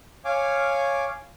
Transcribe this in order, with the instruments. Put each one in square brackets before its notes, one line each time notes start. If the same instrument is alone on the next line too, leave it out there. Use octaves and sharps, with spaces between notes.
[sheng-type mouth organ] C#5 F5 G#5 D6